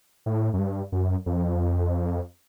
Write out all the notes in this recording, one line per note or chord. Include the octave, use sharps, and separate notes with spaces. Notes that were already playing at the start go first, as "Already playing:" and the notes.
A2
F#2
G2
F#2
F2